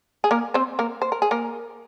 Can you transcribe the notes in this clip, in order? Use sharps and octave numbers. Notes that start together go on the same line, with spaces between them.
G#4
A#3 A#4
C4 C5
A#3 A#4
C5
A#4
G#4
A#3 A#4